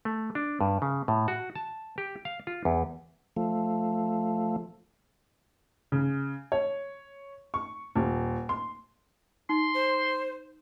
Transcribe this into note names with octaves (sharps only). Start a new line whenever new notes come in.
A3
D4
G2
C#3
A2
F#4
A5
G4
F5
F4
E2
F3 A3
C#3
C#5
C#6
D#1
C6
D#4 C6
C5